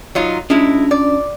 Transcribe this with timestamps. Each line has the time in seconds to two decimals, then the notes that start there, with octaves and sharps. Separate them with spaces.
0.15 F#3 D#4 F4
0.50 G#3 C#4 D4 E4 F4
0.91 D5